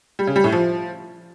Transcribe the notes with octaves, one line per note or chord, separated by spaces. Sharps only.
G3
C#3
G3
A2
F3